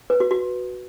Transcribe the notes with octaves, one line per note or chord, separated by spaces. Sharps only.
B4
F#4
F#4